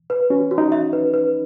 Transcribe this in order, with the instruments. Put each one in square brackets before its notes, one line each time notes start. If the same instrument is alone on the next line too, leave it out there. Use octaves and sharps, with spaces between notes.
[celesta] B4
[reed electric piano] C#4 [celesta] F#4
[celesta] F#4
[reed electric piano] D#4
[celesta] E5
B4
B4